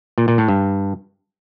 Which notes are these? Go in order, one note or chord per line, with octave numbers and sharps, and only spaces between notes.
A#2
A#2
A2
G2